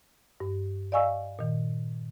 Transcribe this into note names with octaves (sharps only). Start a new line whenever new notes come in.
G2
D5 D#5 F5 G#5 C#6 E6
A#2 D#3